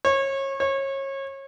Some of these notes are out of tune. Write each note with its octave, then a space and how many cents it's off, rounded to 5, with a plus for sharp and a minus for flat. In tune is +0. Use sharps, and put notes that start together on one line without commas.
C#5 -30
C#5 -30